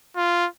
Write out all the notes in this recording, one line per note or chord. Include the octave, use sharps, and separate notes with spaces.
F4